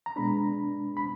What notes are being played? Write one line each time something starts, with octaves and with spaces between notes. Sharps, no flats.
A#5
B2 G#3 B3 D4 B5
B5